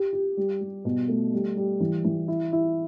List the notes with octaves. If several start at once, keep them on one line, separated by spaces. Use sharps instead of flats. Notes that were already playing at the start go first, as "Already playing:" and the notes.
Already playing: G4
G4
G3
G3
B2
A3
G3
G3
E3
E3
E4
E4